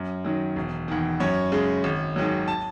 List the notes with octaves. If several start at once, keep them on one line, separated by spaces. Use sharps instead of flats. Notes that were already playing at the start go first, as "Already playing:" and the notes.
Already playing: F#2
D#3 F#3
E1
E2 D#3
F#2 C#5
C#3 G#3
G#1
G#2 D#3 F#3
A5